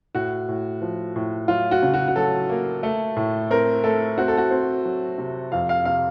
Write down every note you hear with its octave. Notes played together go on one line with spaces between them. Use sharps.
A2 F#4
A2
F3
A2
F#3 F4
F#4
C#3
F#4
F#4
F#3 A4
A#3
A3
A2
C4 A#4
A3 A4
C4 F#4
A4
F#4
C4
F#3
C3
F2 F5
F5
C3 F5